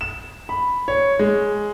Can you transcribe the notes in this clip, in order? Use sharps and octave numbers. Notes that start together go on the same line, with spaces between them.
E7
B5
C#5
G#3